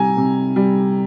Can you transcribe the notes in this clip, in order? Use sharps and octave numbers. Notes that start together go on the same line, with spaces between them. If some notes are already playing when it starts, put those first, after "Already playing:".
Already playing: C3 G3 G#5 A#5
C3
G3